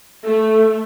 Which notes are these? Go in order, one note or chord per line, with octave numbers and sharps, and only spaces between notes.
A3